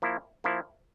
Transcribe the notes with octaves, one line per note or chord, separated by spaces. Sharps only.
F3 A#3 E4
F3 A#3 E4